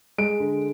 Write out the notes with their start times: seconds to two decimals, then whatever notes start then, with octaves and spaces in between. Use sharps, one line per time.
0.18 G#3 D7
0.40 D3